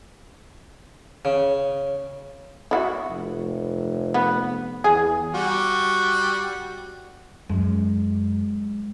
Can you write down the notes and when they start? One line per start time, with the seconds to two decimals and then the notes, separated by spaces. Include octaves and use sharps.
1.25 C#3
2.71 E4 F#4
3.09 F1
4.14 B3
4.84 E2 G#4
5.34 G3 F#4
7.49 F#2 G#3